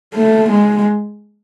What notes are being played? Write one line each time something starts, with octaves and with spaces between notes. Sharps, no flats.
A3
G#3